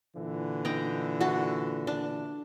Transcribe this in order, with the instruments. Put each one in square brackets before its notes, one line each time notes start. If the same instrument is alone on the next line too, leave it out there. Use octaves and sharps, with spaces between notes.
[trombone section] A#2 D3 E3
[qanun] D#4 G5 A#5
F#4 A4
D4